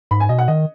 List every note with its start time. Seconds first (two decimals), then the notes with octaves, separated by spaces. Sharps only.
0.11 G#2 B5
0.20 G#5
0.29 B2 D#5
0.39 F#5
0.48 D#3 D#5